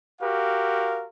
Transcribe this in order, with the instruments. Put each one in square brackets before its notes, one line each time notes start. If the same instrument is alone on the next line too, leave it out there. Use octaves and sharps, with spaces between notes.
[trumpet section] F#4 G4 A#4 F5